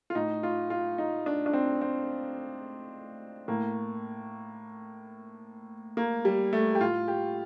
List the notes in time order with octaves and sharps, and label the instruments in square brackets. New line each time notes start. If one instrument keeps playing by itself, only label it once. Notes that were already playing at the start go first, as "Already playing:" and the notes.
[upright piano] F4
A2 D#4
F4
F4
D#4
D4
D4
C4
C4
A2 A#3
A#3
G3
A3
G4
A2 F4
G4